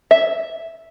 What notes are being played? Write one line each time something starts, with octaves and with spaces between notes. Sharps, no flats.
E5